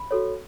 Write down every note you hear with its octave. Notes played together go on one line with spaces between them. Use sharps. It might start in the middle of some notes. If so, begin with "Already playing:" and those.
Already playing: B5
F#4 A4 C#5